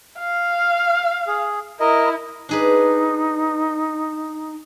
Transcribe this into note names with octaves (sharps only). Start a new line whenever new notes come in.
F5
G#4
E4 A#4 D#5
D4 D#4 G#4 B4